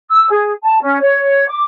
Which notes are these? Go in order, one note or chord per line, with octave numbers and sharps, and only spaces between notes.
E6
G#4
A5
C#4
C#5
D6